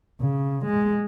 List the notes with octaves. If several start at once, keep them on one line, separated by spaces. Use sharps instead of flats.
C#3
G#3